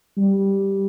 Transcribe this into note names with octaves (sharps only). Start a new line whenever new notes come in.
G3